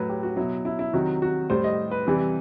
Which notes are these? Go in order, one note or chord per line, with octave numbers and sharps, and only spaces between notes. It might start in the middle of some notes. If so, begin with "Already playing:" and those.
Already playing: A2 F#3 B4
G4
F#4
B2 F#3 E4
E4
E4
C3 D#3 F#3 F#4
F#4
A2 G3 C5
D#5
B4
C3 E3 G3